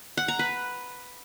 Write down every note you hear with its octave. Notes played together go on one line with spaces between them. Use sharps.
F#5
A#5
B4